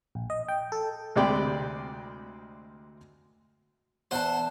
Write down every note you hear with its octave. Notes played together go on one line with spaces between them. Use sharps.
A#1
D#5
G5
A4
D2 C3 G#3 D5 G5 B5
E2 C5 F#5 A5